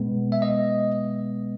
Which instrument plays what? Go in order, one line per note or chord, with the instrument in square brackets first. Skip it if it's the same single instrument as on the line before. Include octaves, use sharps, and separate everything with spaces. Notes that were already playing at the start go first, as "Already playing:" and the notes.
Already playing: [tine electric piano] B2 G#3 B3
E5
D#5